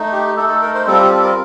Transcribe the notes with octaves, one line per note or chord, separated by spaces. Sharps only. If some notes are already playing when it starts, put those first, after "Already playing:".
Already playing: A3 D#4
G4
A3 D#4 A4
A4
A#4
C5
G3 C4 F4 A4
G4
A4
A#4